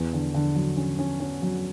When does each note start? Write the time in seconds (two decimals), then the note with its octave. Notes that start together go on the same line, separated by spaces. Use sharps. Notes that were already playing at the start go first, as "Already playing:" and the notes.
Already playing: E2
0.13 D3
0.34 D3
0.55 F#3
0.76 C#4
0.99 C#4
1.20 C#4
1.42 F#3